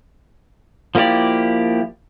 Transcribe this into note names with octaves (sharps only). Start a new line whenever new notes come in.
F3 A#3 E4 G4 D5